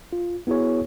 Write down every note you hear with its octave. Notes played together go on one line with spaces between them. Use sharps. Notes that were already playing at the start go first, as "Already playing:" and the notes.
F4
B3 E4 F#4 G#4 C#5